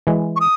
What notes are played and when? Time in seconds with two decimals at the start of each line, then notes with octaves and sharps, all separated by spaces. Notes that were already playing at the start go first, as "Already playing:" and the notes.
0.07 E3 G#3
0.36 C#6
0.40 D#6